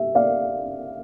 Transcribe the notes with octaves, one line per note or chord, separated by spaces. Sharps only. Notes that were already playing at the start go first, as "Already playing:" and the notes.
Already playing: G3 E5
D5 F5